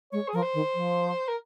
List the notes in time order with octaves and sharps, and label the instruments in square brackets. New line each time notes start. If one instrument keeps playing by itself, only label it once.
[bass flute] G#3 [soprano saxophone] C#5
[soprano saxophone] G#4
[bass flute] F3 [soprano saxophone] A#4
[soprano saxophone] C5
[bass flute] D#3
F3
[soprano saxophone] A#4